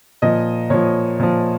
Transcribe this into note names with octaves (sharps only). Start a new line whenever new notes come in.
A#2 F3 D#5
A#2 F3 C#5
A#2 F3